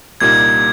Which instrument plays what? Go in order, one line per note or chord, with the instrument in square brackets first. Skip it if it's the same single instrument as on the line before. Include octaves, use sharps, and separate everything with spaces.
[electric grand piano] C2 A#2 G3 A#3 D#4 [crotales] G#6